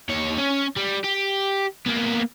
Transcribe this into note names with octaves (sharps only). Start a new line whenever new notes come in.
D#2 C#5
C#4
G3
G4
A#3 B3